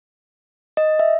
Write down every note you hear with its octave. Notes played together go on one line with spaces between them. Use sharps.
D#5
E5